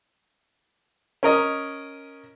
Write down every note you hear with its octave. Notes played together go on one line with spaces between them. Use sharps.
C#4 A#4 D#5